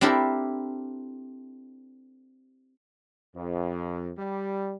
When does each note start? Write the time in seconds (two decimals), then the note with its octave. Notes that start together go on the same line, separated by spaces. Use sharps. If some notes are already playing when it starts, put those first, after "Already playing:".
0.01 C4 D4 E4 G4 A4 A#4
3.35 F2
4.18 G3